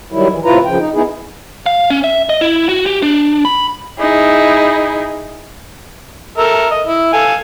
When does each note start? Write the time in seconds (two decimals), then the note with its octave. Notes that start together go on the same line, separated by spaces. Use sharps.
0.12 D#3 F#3 G3 E4
0.31 E3
0.45 A2 C3 E4 F4 B4 A#5
0.65 F#2 C#3 F3 G5
0.78 D#4
0.94 B3 D#4 E4 G#4
1.66 F5
1.90 C#4
2.04 E5
2.29 D#5
2.41 E4
2.69 F#4
2.86 G4
3.02 D4
3.45 B5
3.99 D#4 E4 G#4
6.38 A4 A#4 E5
6.71 D#5
6.87 E4
7.13 A4 F5 G#5